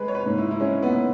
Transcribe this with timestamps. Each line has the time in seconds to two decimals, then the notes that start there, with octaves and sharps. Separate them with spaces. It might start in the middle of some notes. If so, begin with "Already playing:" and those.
Already playing: G#3 B4
0.08 C#5
0.15 B4
0.26 G#2
0.38 E4
0.51 E4
0.60 G#3 C#4
0.83 B3